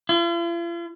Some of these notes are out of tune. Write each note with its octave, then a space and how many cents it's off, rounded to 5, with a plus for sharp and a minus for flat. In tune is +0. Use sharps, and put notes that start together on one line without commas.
F4 -45